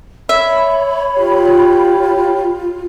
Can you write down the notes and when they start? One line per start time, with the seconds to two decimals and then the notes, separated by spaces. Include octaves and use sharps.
0.29 C#5 E5 B5
1.18 F4 G4